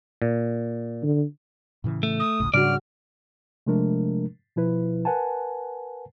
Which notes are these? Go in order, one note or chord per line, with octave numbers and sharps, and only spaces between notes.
A#2
D3
A2 C#3 E3
A3
D#6
G1 C#2 A2
G#2 C#3 G3 D4 F#4 D5 F6
C3 F3 G#3 A3 D4 A#4
B2 F3 E4 B4
A#4 B4 F#5 G#5 A5